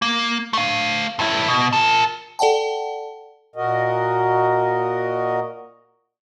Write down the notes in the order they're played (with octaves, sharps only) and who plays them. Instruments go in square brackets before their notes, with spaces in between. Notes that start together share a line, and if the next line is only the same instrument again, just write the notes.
[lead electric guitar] A#3
A3 F5
G2 E4
B2
A#4 A5
[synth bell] A4 D5 F#5 G5 A5
[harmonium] A#2 F#4 A#4 D#5